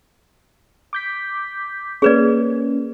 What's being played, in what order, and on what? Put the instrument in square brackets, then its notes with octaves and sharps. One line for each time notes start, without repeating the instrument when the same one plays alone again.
[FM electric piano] D6 G6 B6
[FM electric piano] A#3 C#4 [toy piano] G#4 B4 D5